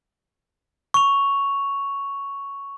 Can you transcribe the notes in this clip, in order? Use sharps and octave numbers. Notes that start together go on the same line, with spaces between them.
C#6 F7